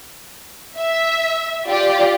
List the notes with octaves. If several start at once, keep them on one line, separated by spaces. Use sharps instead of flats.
E5
F4 G4 D5